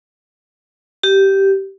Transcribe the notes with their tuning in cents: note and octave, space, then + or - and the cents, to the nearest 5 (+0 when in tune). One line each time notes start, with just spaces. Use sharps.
G4 -10